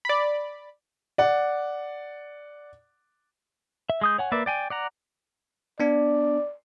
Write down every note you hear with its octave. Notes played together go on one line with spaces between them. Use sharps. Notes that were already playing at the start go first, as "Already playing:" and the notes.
D5 B5
D5 F#5
E5
G#3 D#6 G6
C#5 F#5 G#5
A#3 B4 D5 E5
D5 G5 G#5
D5 F#5 A#5
B3 D4 D5